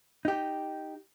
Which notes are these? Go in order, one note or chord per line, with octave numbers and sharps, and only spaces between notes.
D#4 G4